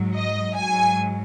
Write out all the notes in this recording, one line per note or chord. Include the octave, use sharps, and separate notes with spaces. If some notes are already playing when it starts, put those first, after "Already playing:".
Already playing: G#2 F#3
D#5
G#2 F#3 G#5